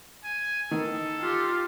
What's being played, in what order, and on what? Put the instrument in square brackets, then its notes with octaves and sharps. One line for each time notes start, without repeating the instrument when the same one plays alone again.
[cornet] G#5
[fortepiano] D#3 [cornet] A4
[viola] F4 G4